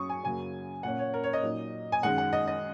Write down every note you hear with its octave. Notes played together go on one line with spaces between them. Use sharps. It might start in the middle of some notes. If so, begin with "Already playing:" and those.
Already playing: F#2 F#3 C#4 C#6 D#6
G#5
F#2 C#3 F#3 A#3 G#5
A#2 A#3 C#4 F#5
C#5
A#4
C#5
D#5
A#2 F#3 D#4
G#5
F#2 D#3 G#3 D#4 F#5
F#5
D#5
D#5